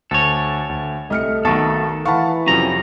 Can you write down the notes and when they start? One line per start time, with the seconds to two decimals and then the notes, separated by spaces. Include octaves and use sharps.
0.11 D2 A4 C#5
0.69 D2
1.10 C2 A3 D#5 F6 C#7
1.45 B1 B2 D#3 D#4 F#4 A4 A5 C#6
2.05 E3 F5 F#5 A5 B5 C#6
2.47 F2 C3 F#3 C#4 A#5